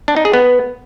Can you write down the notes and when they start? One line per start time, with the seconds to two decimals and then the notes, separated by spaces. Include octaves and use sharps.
0.08 D4
0.16 D#4
0.25 G#4
0.34 B3